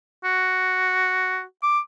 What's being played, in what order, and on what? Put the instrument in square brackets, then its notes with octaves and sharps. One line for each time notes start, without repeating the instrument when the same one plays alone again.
[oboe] F#4
D6